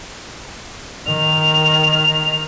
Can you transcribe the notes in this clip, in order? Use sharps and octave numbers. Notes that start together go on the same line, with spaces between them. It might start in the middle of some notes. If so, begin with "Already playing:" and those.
D#3 F7